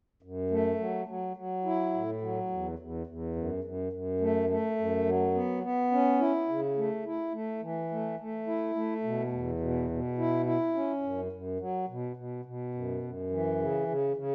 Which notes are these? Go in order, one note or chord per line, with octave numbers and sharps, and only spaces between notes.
F#2
A3
F#3
F#3
F#3
E4
A2
F#3
E2
E2
E2
F#2
F#2
F#2
A3
A3
F#2
F#3
B3
B3
C#4
E4
C#3
A3
E4
A3
E3
A3
A3
E4
A3
B2
E2
B2
B2
E4
E4
C#4
F#2
F#2
F#3
B2
B2
B2
F#2
F#2
E3
C#3
C#3
C#3